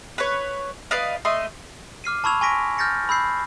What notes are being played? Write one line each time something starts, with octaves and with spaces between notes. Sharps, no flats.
B4 C#5
B4 D5 D#5 F5
A3 D#5 C6
D6 F6 C7 D#7
A5 B5 C#6 E6 G#6 F7
G#5 C6 C#6 A#6 B6 D7
F6 G6 A6 A#6 C#7
B5 E6 G6 C7